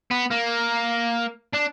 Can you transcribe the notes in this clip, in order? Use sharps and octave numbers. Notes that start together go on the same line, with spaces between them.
B3
A#3
D4